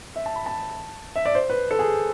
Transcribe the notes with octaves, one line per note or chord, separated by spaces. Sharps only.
E5
A5
B5
A5
E5
D5
C5
B4
A4
G#4